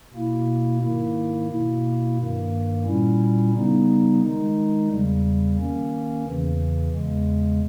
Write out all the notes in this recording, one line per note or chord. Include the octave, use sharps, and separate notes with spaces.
B2 A#3 E4
G#2 D#3 A#3 E4
B2 A#3 E4
G2 D#3 A#3
A#2 G3 C#4 E4
C#3 G3 B3 D#4
D#3 G#3 D#4
E2 C#3 G3
D#3 A#3 C#4
E2 C#3 E3
E2 C#3 G#3